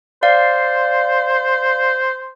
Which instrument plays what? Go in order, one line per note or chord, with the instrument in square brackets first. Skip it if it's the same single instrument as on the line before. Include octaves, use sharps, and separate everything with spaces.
[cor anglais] C5 [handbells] D5 F5